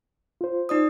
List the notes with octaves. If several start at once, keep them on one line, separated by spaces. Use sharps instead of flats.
F4 C5
D#4 D5 D#6